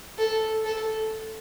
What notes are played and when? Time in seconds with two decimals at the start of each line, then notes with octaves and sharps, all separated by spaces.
0.18 A4
0.65 A4